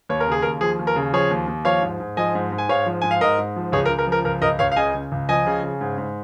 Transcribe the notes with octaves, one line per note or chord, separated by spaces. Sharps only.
D#2 C#5
A#4
C#3
G#4
D#2 A#4
F3 G#4
D#2
A#4
C#3
F3 G#4 C#5
D#2
D#2
F3 C#5 F5
G#2
G#2
F3 D#5 G#5
G#2
G#2
G#5
G#2 C#5 F5
F3
G#2 G#5
F5
G#2 A#4 D#5
G#2
F3
C#2 G#4 C#5
A#4
C#2
A#4
F3
A#4
C#2 A#4
C#2 A#4 D#5
C#2 C#5 F5
F5
C#3 D#5 G#5
C#3
C#2
F3 D#5 G#5
C#3
C#3
G#2
G#2